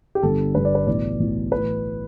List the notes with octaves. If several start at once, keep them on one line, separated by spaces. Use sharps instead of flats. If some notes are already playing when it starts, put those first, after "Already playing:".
G4
G1 G2 D3 A4
G1 G2 D3 B4
D5
B4
B1 A2 E3 D5
B1 A2 E3
A2 E3 B4